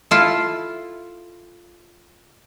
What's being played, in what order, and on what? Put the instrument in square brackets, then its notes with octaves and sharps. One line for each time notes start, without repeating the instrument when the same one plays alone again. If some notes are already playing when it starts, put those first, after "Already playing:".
[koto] E4 F4 A4